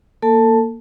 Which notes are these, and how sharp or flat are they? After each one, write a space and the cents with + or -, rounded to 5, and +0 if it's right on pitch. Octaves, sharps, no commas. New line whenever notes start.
A#3 +0 A4 +30 A5 +0